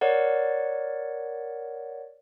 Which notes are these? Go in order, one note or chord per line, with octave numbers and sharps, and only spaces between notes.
A#4 C#5 D5 F#5